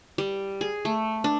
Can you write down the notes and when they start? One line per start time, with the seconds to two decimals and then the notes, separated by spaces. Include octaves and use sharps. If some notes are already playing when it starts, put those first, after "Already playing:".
0.18 G3
0.61 G#4
0.85 A3
1.24 D4